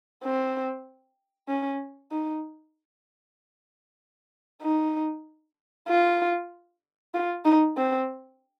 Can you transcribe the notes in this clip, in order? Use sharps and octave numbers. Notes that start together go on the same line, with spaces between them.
C4
C#4
D#4
D#4
F4
F4
D#4
C4